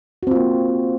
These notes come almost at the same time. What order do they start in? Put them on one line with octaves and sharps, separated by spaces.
F#4 C4 F4 A#3